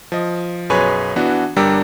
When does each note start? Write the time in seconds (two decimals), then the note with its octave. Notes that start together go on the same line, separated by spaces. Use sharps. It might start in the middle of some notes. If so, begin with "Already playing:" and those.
0.12 F3 D#5
0.70 B1 F#2 G#4 B4 C#5 G#5
1.16 E3 B3 D4 F#4
1.56 G1 G3 D4 G4 A#4 E6